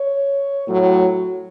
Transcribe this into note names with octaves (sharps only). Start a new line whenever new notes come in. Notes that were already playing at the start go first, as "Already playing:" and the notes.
Already playing: C#5
A2 F#3